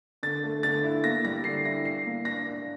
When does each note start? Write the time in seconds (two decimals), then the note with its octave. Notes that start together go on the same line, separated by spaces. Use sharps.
0.23 D3 A6
0.44 A3
0.63 D3 A6
0.83 E4
1.04 A#3 A#6
1.25 G3 A#6
1.44 D3 C7
1.65 E4 A#6
1.85 D4 C7
2.06 A#3
2.25 D4 A#6
2.46 D4